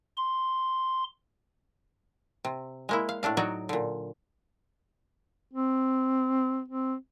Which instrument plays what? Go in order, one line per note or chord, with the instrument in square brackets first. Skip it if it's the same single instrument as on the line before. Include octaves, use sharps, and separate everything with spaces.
[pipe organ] C6
[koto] C3
G#3 A#3 E4
F5
A2 A3 D4 F5
F#3 D#4 F#4 C#5 D5
A#2 D3
[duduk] C4
C4